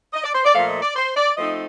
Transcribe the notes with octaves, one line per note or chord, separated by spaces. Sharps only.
D#5
D5
C5
D5
A#2 F3 A3 F5
D#5
D5
C5
D5
F3 A3 C4 D#4 D#5